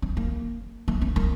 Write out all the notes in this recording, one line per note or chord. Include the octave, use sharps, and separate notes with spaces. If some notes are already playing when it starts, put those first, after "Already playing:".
C4
A#3
A#3
C4
A#3